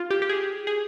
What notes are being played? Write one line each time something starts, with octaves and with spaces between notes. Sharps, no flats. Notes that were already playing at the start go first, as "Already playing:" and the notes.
Already playing: F4
G4
G4
G#4
G#4